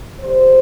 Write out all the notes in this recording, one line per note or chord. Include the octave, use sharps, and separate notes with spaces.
D3 G3 C5